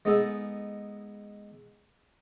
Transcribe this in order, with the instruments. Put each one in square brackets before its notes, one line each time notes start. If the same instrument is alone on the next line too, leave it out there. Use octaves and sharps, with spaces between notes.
[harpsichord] G#3 B3 D#4 G#4 A4